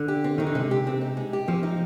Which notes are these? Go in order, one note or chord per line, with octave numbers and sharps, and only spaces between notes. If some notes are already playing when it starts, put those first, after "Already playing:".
Already playing: D3
G4
C4
D#3 D#4
D3
C3 G#3
G4
C4
D#4
G#3
G4
F3 C4
D#4